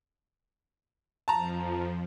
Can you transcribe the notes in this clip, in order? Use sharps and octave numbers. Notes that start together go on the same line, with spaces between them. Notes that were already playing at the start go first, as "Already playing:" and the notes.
F2 F3 A5 A#5